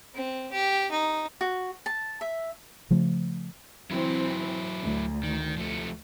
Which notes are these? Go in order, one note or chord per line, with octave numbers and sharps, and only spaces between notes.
C4
G4
D#4
F#4
A5
E5
C#3 F3 A3
E3 F#3 C4 E4
D2
D#3
F3 A3